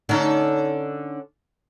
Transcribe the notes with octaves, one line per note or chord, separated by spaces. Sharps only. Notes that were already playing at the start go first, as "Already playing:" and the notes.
D3 C#4 D#4 A4